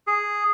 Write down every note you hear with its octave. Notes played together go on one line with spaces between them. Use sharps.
G#4